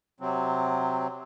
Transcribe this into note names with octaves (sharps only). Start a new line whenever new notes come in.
C3 F#3 C4